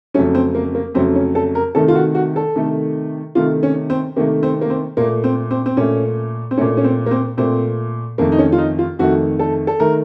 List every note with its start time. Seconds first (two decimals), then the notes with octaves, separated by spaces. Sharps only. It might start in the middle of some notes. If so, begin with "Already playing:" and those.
0.14 F2 C#3 F#3 A3 C#4
0.35 C4
0.55 A#3
0.75 A#3
0.95 F2 C#3 F#3 A3 C4
1.15 C#4
1.35 A4
1.55 A#4
1.75 C3 D#3 A3 A4
1.88 F4
1.95 F#4
2.15 F#4
2.36 A4
2.56 C3 D#3 A3
3.35 C3 D#3 A3 F4
3.63 C#4
3.90 C4
4.16 C3 D#3 A3 A#3
4.43 C4
4.61 A#3
4.70 C4
4.97 A#2 A3 A#3
5.24 C4
5.51 C4
5.66 C4
5.77 A#2 A3 C#4
6.51 C4
6.57 A#2 A3 C#4
6.77 C#4
6.84 C4
7.06 A#3
7.11 C4
7.37 A#2 A3 C4
8.18 F2 D#3 A3 A#3
8.32 D#4
8.39 C#4
8.52 F4
8.58 D#4
8.79 F4
8.99 F2 D#3 A3 F#4
9.39 A4
9.67 A4
9.80 D#3 A3 A#4